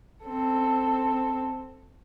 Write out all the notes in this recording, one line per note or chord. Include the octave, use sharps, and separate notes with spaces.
C4 A4